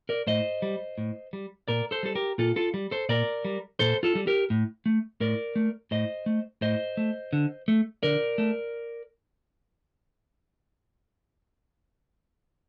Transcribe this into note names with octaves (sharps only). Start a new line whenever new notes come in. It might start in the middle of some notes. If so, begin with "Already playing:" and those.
A#4 D5
A2 C5 D#5
G3
A2
G3
A#2 A#4 D5
A4 C5
G3 A4
G4 A#4
A#2 F4 A4
F4 A4
G3
A4 C5
A#2 A#4 D5
G3
A#2 A4 C5
F4 A4
G3
G4 A#4
A2
A3
A2 A#4 D5
A3
A2 C5 D#5
A3
A2 C5 D#5
A3
D3
A3
D3 A#4 D5
A3